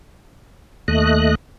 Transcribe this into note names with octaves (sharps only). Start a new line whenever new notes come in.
D#2 A3 D#5 F#6